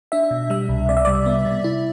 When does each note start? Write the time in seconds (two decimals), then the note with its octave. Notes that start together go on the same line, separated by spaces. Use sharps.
0.12 D4 E5
0.31 B2
0.50 G3 E5
0.69 C2
0.89 C3 D5
0.97 E5
1.05 G3 D5
1.26 B3
1.46 C3
1.64 E4